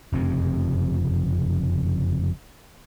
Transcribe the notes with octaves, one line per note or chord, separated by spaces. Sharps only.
F#1 F2 C3